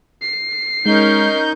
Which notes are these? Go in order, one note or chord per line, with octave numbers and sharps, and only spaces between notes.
C7
G#3 C#4 D#4 A#4 G6